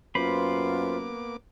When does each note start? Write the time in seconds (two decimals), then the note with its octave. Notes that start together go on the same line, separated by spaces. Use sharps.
0.15 F#2 A#3 B3 F4 B4 C5 B5 D6